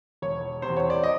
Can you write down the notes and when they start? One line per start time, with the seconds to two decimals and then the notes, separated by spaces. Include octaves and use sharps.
0.22 E1 C#5
0.62 C3 C5
0.68 E2
0.77 C#5
0.90 D5
1.04 D#5